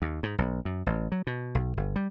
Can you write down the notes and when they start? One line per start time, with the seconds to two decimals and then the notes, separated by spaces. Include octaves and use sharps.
0.02 D#2
0.23 G#2
0.38 B1
0.65 F#2
0.86 A1
1.12 F#3
1.27 B2
1.55 B1
1.77 G1
1.96 G3